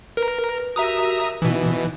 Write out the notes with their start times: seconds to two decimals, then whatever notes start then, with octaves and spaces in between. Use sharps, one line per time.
0.17 A#4 B4
0.76 F#4 G4 A#4 E5 A#5 D#6
1.42 B2 E3 D#4